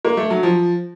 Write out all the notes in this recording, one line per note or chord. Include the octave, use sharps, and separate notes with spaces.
A#3
A3
F#3
F3